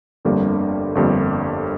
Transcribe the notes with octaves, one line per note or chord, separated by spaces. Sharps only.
G1 F2 D3 G3 A#3
G1 F2 D3 G3 A#3